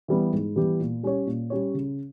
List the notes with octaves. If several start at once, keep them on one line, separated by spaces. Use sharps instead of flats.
E3 G3 B3 G4
G#2
E3 G3 B3 G4
A#2
G3 C#4 G4 C#5
A#2
G3 C#4 G4 C#5
C#3